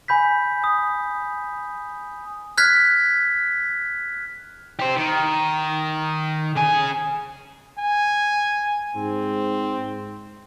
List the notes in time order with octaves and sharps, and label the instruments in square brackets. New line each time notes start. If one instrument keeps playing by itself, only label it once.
[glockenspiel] G#5 B5 G6 B6
D#6
F6 F#6 G#6 B6
[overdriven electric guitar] G4 C5
D#3
C#3 G#5
[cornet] G#5
[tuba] G#2 [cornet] C4